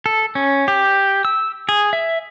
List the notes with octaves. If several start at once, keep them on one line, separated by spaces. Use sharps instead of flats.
A4
C#4
G4
E6
G#4
E5